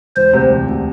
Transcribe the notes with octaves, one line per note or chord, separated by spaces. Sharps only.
E1 C5
D2 C3
E1
D2 C3